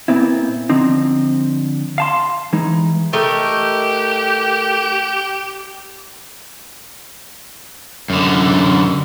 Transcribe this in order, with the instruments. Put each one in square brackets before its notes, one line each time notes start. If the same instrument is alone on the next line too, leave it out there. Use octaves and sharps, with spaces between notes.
[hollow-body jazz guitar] A#2 B3 C4 E4
D3 F3 C4 D#4
F5 A5 C6
E3 G#3 D#4
[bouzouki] A3 A#4 D#5 [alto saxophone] G4
[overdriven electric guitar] F#2 D3